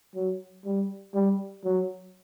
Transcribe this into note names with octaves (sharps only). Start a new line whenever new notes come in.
F#3
G3
G3
F#3